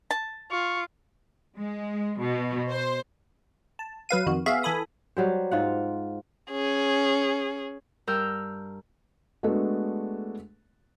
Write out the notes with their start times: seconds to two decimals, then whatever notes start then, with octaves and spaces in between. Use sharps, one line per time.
0.11 A5
0.51 F4 C#6
1.57 G#3
2.19 B2
2.70 C5
3.79 A5
4.09 F#3 B4 F5 D#7
4.26 F2 D#3 F#4
4.46 B3 F#4 G#4 E5 F5
4.63 E3 A4 G#5 B5 D#6
5.17 F#3 G3 C5
5.51 G#2 F4 F#5
6.51 C#4 G#4
8.07 G2 A#4 E6 F6 G6
9.43 G#3 A3 B3 D4 F#4 A4